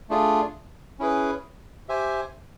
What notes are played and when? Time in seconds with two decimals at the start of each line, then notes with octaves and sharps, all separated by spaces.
0.09 A3 D4 F4 G#4
0.99 C#4 E4 G#4 B4
1.89 G4 C5 E5 G#5